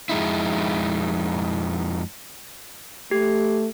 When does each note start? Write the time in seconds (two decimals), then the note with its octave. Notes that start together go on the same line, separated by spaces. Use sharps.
0.09 F2 G#3 D#4 E4
3.11 A3 G4